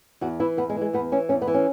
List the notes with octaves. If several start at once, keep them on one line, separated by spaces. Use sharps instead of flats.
E2 F#4
E3 E4
E2 B3
G#3
E3
G#3
E2 B3
E3 C#4
E2 C#4
B3
E3
C#4